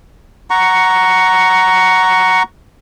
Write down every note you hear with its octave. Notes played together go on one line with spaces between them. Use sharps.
F#5 A#5 C#6